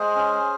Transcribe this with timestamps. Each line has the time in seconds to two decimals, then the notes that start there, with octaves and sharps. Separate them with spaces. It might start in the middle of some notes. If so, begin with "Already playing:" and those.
Already playing: G#3 G#4 C5
0.15 C#4